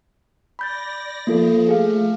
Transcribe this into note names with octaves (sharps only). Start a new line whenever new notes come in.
D5 B5 G6 A6 A#6
F3 A#3 F4 A4
A3 G#4 F5